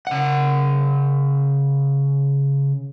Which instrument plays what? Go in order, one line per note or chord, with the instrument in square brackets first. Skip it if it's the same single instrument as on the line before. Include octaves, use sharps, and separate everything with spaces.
[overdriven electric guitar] C#3 F#5